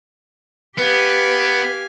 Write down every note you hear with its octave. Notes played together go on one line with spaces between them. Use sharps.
B3 G4 B4 F5 G#5